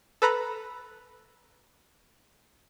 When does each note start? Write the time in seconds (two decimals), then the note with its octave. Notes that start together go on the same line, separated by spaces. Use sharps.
0.22 A4 B4 A#5 B5